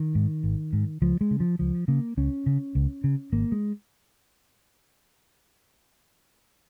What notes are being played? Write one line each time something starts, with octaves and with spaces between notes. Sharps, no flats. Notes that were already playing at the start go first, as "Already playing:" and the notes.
Already playing: D#3
G#2
G#1
G#2
C#2 F3
G#3
C#3
F3
C#2 F3
C#3 A#3
C#2 C#4
C#3
C#2
C#3
G#1 A#3
G#3